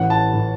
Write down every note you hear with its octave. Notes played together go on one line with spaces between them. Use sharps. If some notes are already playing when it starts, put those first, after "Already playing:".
Already playing: A1 A2 E3 F#5
A5
A2 E3